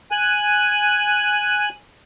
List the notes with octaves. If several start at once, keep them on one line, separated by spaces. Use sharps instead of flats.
G#5 F#6